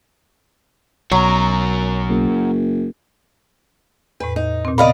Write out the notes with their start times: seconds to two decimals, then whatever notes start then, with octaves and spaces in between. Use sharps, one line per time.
1.12 B1 F#3 F#4 A#4
2.09 F#1
4.20 E2 A2 B4
4.36 D#4
4.65 A#2 C4
4.78 A#2 C#3 B3 A#4 D5 D#5 F5 B5